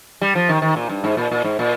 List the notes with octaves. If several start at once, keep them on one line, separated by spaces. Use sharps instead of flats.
G3
F3
D#3
D#3
A#2
G2
G#2
A#2
A#2
G#2
A#2